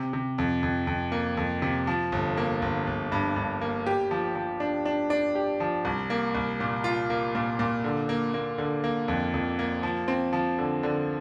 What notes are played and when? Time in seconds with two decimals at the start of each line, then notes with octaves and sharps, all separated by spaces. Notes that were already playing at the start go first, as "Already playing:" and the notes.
Already playing: C3
0.13 C3
0.38 F2
0.63 F2
0.87 F2
1.12 A#3
1.37 F2
1.62 C3
1.87 F3
2.12 G1
2.37 A#3
2.62 G1
2.87 G1
3.12 G2
3.36 G2
3.61 A#3
3.86 G4
4.11 F3
4.35 F3
4.60 D4
4.85 D4
5.10 D4
5.35 G4
5.60 F3
5.85 C2
6.10 A#3
6.35 C2
6.60 A#2
6.84 F4
7.10 A#3
7.35 A#2
7.59 A#2
7.84 D3
8.09 A#3
8.34 A#3
8.58 D3
8.84 A#3
9.08 F2
9.34 F2
9.59 A#3
9.83 F3
10.08 C4
10.33 F3
10.58 D3
10.83 D3